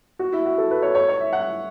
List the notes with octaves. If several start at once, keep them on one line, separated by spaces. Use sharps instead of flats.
F#4
E4
F#4
A4
B4
C#5
C#5
C#5
E5
F#5